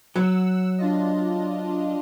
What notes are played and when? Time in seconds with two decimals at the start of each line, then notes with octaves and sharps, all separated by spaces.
0.16 F#3 F#5 E6
0.78 D4 F4 D#5